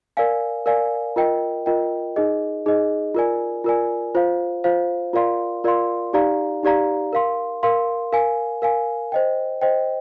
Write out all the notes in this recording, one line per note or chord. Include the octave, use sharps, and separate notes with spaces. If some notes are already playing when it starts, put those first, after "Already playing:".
A#4 D5 F5 G#5
A#4 D5 F5 G#5
F4 A#4 D#5 G5
F4 A#4 D#5 G5
D#4 G#4 D#5
D#4 G#4 D#5
F4 A#4 D5 G#5
F4 A#4 D5 G#5
F4 C5 F5
F4 C5 F5
F4 A#4 D5 F5 C6
F4 A#4 D5 F5 C6
D#4 G4 D5 F5 A#5
D#4 G4 D5 F5 A#5
A#4 F5 C6
A#4 F5 C6
A#4 F5 G#5
A#4 F5 G#5
C5 D#5 G5
C5 D#5 G5